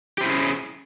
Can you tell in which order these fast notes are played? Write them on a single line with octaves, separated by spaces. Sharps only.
G4 C5 E4 C#4 G#4